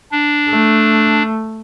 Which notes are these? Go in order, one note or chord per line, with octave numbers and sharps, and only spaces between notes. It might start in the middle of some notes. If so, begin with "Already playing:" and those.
D4
A3